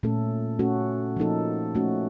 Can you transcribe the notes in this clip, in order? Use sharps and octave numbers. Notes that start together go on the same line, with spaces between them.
A#2 A3 C#4 A4
A3 C#4 F#4 A4
F3 A#3 D#4 A4
A3 C#4 F#4